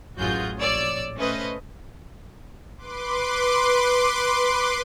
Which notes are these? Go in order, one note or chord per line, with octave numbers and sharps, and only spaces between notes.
A1 F#2 F4 F#4 G#4 G6
A#1 C#5 D5 E6
A3 C#4 B4 C5 D#5
B4 C6 D6